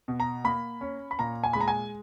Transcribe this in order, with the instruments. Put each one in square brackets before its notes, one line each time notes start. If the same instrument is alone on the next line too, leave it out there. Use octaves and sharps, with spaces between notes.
[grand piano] B2
A#5
A#3 B5
C#4
B5
A#2 A#5
G#5
G#3 B5
A#5
G#5